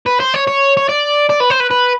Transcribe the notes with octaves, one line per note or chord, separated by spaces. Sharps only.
B4
C5
C#5
C#5
C#5
D5
D5
B4
C5
B4
B4